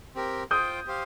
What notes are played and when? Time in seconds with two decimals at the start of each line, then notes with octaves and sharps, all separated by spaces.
0.15 C4 G4 A#4
0.51 F4 C5 G5 D#6 G6
0.87 G4 C5 F5